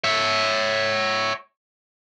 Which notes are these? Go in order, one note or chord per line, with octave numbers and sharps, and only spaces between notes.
C#5 E5